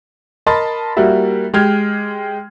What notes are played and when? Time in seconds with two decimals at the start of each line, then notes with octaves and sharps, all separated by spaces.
0.46 A#4 D#5 A5 B5 C6 A6
0.97 G3 A#3 E4 F#4 E5
1.54 G#3 G4 G5 F6 G#6